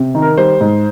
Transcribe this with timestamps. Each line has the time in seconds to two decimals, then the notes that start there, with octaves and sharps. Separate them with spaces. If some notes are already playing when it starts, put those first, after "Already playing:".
Already playing: C3
0.15 D#3
0.22 A#4
0.38 G3 C5
0.61 G#2